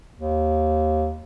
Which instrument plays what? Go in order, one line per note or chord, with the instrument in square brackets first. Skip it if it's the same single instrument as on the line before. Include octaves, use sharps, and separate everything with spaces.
[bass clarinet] D#2